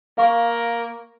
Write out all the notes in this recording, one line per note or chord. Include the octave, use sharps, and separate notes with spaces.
A#3 F5 C#6